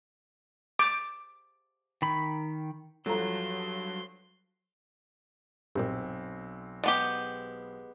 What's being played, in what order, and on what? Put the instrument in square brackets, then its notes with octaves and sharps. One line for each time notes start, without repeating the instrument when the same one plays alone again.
[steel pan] D6
[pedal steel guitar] D#3 B5
[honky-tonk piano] G2 F3 [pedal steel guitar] F#3 [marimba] A4 A#5 [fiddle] C6
[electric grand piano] B1 C4 [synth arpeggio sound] G2 A#2
[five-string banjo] G#3 B3 G4 [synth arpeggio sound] D5